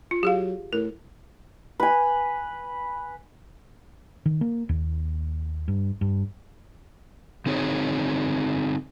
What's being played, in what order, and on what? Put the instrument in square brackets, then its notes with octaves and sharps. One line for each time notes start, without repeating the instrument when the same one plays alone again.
[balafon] F4
[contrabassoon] F#3 [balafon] G4 G#4 F5
[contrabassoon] A2 [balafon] A#4
[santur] B4 G#5
[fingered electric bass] D#3
A#3
D#2
G2
G2
[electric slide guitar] D3 C4 D#4 G#4 C#5